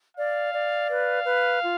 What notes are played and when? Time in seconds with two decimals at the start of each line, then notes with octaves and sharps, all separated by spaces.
0.17 D5 F5
0.53 D5
0.89 B4 F5
1.26 B4
1.62 F4